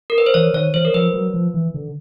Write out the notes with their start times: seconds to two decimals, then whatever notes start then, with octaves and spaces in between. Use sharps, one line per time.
0.10 A#4
0.18 B4
0.26 C5
0.34 E3 C#5
0.54 D#3 C#5
0.74 E3 C5
0.85 A#4
0.94 F3 B4
1.14 F#3
1.34 F3
1.54 E3
1.74 D3